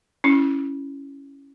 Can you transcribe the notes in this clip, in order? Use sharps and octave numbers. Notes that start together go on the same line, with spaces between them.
C#4 E4